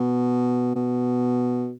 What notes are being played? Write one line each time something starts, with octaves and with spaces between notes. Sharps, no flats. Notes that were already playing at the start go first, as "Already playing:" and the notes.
Already playing: B2
B2